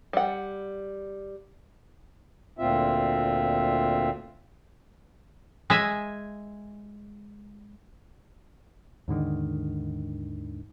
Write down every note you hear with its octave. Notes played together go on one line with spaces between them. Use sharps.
G3 F#5
D2 A#2 C4 F4 E5
G#3 E5 G#5
D#2 G#2 D3 D#3